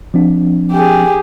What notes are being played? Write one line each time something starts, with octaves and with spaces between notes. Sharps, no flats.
F3 C4 D4
G4 G#4